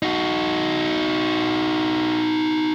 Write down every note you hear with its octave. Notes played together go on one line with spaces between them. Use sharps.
D#4 F#4